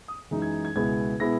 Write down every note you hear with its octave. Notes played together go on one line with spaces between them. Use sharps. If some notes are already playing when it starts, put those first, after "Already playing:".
D#6
F#2 E3 G#3 D#4
G#6
G#6
C#2 B2 G#3 B3 E4 G#6
B2 G#3 B3 E4 A#6